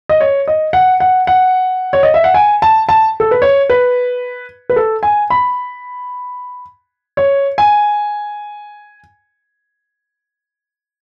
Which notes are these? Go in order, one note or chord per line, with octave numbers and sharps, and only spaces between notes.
D#5
C#5
D#5
F#5
F#5
F#5
C#5
D#5
E5
F#5
G#5
A5
A5
A4
B4
C#5
B4
B4
A4
G#5
B5
C#5
G#5